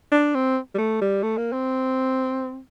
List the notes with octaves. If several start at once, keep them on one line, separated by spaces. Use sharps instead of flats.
D4
C4
G3
A3
G3
A3
A#3
C4